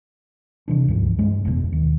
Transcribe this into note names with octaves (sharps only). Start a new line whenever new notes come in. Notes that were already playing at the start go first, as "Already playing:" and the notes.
C3 E3 D4
C#2 G2 F3
G2 G#3 C#4
F#1 E2 B2
D#2